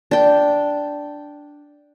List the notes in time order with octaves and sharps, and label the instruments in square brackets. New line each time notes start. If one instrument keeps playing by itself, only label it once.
[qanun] D4 G5